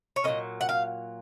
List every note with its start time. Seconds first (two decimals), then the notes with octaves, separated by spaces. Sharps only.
0.16 C#5
0.24 A#2 F#3 A#3 C#4 D#5
0.61 F#5
0.69 F5